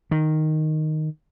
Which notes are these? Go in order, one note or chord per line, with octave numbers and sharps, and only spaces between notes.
D#3